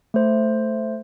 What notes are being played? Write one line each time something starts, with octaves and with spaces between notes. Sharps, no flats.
A3 C5